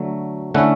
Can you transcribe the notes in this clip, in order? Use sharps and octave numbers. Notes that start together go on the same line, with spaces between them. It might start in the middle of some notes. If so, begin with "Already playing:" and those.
Already playing: D3 F#3 A3
D3 A3 C#4 E4 F#5